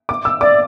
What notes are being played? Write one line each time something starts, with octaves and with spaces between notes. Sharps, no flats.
D6
E6
D5 D6